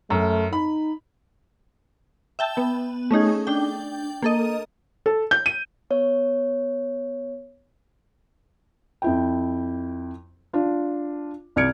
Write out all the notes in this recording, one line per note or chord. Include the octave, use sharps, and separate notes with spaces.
F#2 A3
D#4 B5
E5 G5 A5
B3
A3 C#4 D#4 G#4
D4 G5
A#3 A4 D#5
A4
G6
D#7
B3 C#5
F2 E4 G5
D4 F4
C2 D5 F6 G#6 C#7 D7